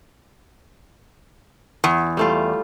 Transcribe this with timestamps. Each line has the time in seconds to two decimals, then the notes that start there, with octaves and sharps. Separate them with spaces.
1.84 E2
2.17 G3 A3 F4